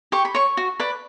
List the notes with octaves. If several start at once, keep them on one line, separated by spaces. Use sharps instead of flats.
G4 C#6
B5
C#5 C#6
F#4
B4 D5